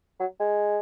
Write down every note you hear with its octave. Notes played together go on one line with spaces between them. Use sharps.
F#3
G#3